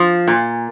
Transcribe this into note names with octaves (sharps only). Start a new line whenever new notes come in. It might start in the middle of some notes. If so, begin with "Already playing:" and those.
Already playing: F3
A#2